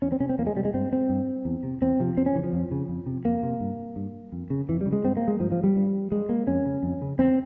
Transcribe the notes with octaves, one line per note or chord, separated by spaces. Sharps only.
E2 C#4
C4
C3 C#4
C4
E2 A#3
G#3
C3 G3
G#3
G2 C4
C4
G2
E2
C3
E2 C4
C3 F3
F2 C4
C#4
C#3 E3
F3
F2
C#3
F2
C3
F2 A#3
C3
G2
G2
F2
C#3
F2 E3
G3
C#3
G#3
G2 C4
A#3
G#3
G2 F3
F3
G3
G2
G2 G#3
A#3
F2 C#4
C#3
F2
C#3
E2 C4